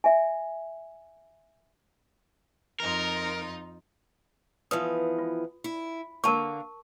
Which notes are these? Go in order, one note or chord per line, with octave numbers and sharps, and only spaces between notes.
E5 G#5
F2 D#4 F4 A#4
E3 F3 B3 B4 D#6
F4
E4
D3 A#3 A#4 A5 C#6